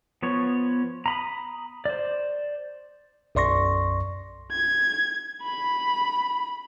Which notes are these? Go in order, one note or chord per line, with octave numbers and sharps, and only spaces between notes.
F3 B3 C#5
A#5 B5 D#6
C5 D5
B1 F#2 D5 C6 C#6 A#6
G#6
B5